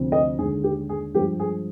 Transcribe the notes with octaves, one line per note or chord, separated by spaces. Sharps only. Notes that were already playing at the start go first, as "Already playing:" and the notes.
Already playing: D2 C3 F3 C4
D#5
D#2 D3 G#3 G#4
G4
G#4
G2 F3 G#3 G4
G#4